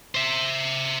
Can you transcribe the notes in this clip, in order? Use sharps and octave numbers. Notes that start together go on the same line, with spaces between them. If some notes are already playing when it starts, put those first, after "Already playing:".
C5 E5